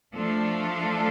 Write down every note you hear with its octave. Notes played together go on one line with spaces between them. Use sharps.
F3 A3 D4 F4 A4